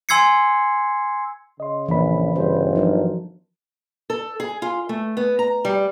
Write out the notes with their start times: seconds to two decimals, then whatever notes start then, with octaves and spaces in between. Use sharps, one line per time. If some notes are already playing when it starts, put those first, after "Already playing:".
0.09 G#5 C6 E6 G#6 C7 C#7
1.60 C#3 D#5 C6
1.88 A#1 D#2 E3 B5
2.36 G1 C#3 C5
2.76 F3 F#3 D4 D#4 A#4
4.10 A4
4.40 G#4
4.62 F4
4.89 A3
5.17 B3
5.39 A#5
5.65 G3